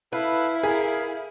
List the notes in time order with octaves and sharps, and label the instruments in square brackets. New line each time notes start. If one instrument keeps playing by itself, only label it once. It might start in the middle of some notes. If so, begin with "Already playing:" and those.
[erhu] E4 [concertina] A4 F5 [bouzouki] B4
[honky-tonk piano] G#4 [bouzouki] A#4 [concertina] F5